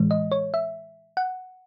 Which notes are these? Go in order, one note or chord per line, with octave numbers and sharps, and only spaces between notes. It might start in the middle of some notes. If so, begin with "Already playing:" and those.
Already playing: A2 E3 G#3
D#5
C#5
E5
F#5